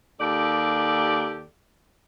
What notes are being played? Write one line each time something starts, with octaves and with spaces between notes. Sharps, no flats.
D#2 G4 A4 D5